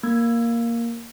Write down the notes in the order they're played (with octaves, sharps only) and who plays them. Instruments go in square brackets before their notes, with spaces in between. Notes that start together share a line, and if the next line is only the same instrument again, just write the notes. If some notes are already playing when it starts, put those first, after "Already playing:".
[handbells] A#3 G#6